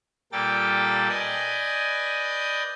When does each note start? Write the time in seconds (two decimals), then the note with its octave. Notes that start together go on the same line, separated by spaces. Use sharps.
0.32 A#2 G3 A#3 A4 G5 A6
1.09 B4 D5 D#5 G#5 G6